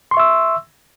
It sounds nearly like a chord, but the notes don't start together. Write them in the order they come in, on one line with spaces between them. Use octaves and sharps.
C6 C#6 E5 E6